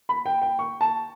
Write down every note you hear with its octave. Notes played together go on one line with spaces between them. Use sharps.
B5
G5
G5
C#6
A5